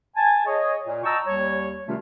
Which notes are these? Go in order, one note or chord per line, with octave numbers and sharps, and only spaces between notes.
G#5 A5
G#4 C#5 D#5
A#2
D#5 G5 A5 A#5 C#6 E6
D#2 G3 C#5
C3 D#3 G3 A3 C#4 F4